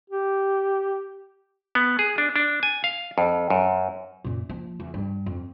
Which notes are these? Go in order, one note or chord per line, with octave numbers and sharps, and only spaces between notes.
G4
B3
G#4
D4
D4
G#5
F5
F2
F#2
F#2 A#2
F3 A#3
E2
G2
F2